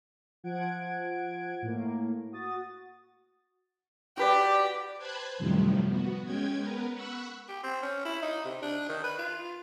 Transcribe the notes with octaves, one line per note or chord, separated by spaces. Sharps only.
F3 F#5 G#6 D7
A2 A#3
F#4 D#6 A6
F#4 G4 B4 D5
B4 C5 A5 B5 F#6 G#6
F#2 A2 C3 D#3 F3 G3
B3 F#4
G#3 C#4 G5 G#6
B3 A#4 B4
F#5 B5 C#6 E6 F#6
G4
C4
C#4
E4
D#4
C3
D4
D#3
B4
F4